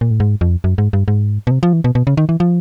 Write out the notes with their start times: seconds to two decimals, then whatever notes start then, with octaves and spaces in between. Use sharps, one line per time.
0.01 A#2
0.11 A2
0.20 G#2
0.41 F2
0.64 F#2
0.78 G#2
0.93 G2
1.08 G#2
1.47 B2
1.51 C3
1.63 F3
1.73 E3
1.84 B2
1.95 B2
2.07 C#3
2.17 D#3
2.29 E3
2.40 F3